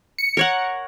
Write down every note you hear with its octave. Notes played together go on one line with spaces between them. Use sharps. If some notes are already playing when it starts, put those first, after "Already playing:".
C#7
A#4 C#5 F#5